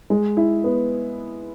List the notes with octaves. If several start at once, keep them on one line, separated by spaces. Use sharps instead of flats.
G#3
E4
B3